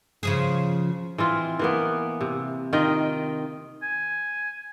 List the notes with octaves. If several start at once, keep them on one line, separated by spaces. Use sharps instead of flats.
C#3 F3 G#4
E3 C4 F4
E3 A#3 B3
C3
D#3 F4 D#5 G5
G#5